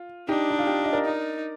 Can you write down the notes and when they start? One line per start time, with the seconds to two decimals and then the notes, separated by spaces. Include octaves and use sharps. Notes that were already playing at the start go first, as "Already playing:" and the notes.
Already playing: F4
0.29 D4 D#4 G4
0.51 D#4
0.59 F4
0.67 D#4 G4
0.84 D#5
0.93 A#4 D5
1.06 D#4